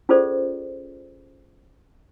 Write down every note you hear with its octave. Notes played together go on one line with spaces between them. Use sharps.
C#4 F4 G#4 A4 C5 D5